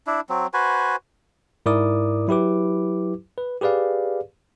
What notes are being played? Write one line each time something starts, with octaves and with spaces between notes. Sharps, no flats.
D4 E4
F#3 C4
F#4 B4 C5 G#5
G#2 E4 A#4 D5 D6 D#6
F#3 E4 G4 B4 D6
B4
G4 G#4 B4 D5 F5